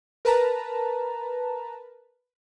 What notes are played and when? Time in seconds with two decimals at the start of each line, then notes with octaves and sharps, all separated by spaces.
0.25 A#4 B4 A5 A#5